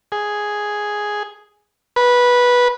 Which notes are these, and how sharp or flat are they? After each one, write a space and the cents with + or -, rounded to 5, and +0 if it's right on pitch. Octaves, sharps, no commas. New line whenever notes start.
G#4 +0
B4 -15